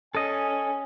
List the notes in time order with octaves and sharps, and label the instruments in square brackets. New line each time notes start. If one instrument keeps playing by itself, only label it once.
[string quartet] C#4 [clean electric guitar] A4 D#5 [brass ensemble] G#5